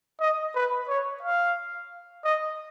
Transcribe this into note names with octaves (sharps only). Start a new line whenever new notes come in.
D#5
B4
C#5
F5
D#5